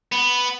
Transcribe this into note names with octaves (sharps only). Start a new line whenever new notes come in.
B3